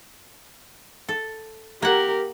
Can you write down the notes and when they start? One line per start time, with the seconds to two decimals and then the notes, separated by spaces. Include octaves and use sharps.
1.09 A4
1.82 A#3 G4 A#4 F#5